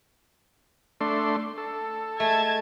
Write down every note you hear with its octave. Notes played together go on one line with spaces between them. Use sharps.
A3 D4 C6
A4
G#3 A3 A5 G#6